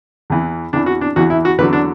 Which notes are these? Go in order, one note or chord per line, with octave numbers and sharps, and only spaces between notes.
E2 E3
E2 E3 D4
F#4
D4
E2 E3 F#4
E4
F#4
E2 D3 F#3 B4
D4